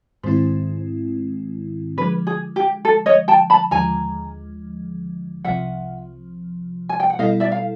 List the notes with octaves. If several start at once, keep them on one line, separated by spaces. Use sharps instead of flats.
G#2 D#3 G#3 C4 E4 C5
D3 F3 G#3 B4
G#4
G4
A4
C#5 D#5
G5 A5
A5 B5
D#2 D3 F3 G#3 G#5 A#5
C2 C3 F3 E5 F#5
G#5
G5
F#5
B2 G3 B3 E4 A4 D#5 F5
D5 E5
F5